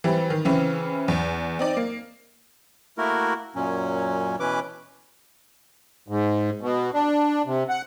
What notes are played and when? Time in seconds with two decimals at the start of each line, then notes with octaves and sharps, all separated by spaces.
0.04 E3 G3 C4
0.30 D#3
0.45 C#3 E3 C4 C#4
1.08 E2
1.59 C4 D#4 D5
1.77 A#3
2.98 A3 A#3 E4 F#4 A#4
3.55 F#2 A#2 F#3 C#4
4.40 B2 E3 C#4 B4 D6
6.08 G#2
6.61 B2
6.94 D4
7.46 C3
7.69 F#5